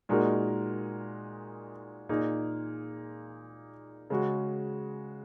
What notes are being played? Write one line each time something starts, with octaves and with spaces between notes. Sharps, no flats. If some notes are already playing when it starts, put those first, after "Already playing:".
A#2 G#3 D#4 F#4 A#4
A#2 A#3 D#4 G#4
C#3 G#3 F#4